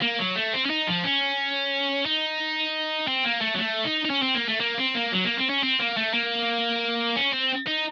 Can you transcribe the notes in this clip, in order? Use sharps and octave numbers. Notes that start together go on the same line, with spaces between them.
A#3
F#3
A3
C4
C#4
D#4
F3
C#4
D#4
C4
A#3
A3
F#3
A3
D#4
D#4
C#4
C4
A#3
A3
A#3
C4
A#3
F#3
A#3
C4
C#4
C4
A#3
A3
A#3
C#4
C4
D#4